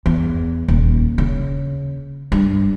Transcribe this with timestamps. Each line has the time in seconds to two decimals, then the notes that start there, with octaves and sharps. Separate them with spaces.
0.06 E2
0.68 D#1
1.18 C#3
2.32 G2